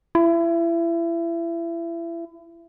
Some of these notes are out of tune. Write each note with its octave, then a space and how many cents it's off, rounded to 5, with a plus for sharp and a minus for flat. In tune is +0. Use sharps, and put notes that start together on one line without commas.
E4 +30